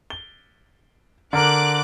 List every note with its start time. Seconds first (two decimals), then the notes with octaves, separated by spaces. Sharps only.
0.10 G7
1.33 D3 A#4 D6 F#6